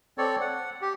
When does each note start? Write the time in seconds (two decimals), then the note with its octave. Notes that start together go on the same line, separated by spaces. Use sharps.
0.18 C4 A4 C#5 D5
0.40 F#5
0.81 G4